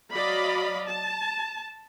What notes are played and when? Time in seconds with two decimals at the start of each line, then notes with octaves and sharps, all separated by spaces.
0.11 F#3 D5 D#5 F5 B5
0.87 A5